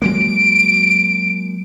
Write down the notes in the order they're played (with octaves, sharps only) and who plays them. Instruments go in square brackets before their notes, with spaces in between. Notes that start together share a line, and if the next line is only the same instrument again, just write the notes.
[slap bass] F#3 G#3 A#3 [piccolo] D7